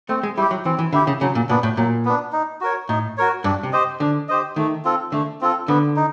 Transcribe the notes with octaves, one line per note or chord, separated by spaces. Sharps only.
A3 C4
G#3
G3 E4 G4
F#3
E3 C4
E3
D3 E4 G4
C#3
C#3 F#3
A#2
A#2 B3 D4
A2
A#2 F#3
B3 D4
D#4
F#4 A#4 C#5
A2 D#4
F#4 A#4 C#5
G2 D4
C3
G4 C5 D#5
D3 D4
G4 C5 D#5
D#3 A3
C4 F4 A4
D3 A3
C4 F4 A4
D3 B3
D#4